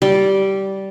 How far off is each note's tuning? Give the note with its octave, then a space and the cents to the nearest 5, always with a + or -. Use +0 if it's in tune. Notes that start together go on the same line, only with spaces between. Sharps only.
G3 -15 B5 +0